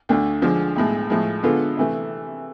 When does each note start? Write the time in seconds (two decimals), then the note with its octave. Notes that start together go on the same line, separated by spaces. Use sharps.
0.09 D2 D3 A3
0.42 D3 F3 G#3
0.76 B1 A2 G#3
1.10 A2 F3 G#3
1.43 D3 G#3 B3 F4 A4
1.77 C3 E3 A3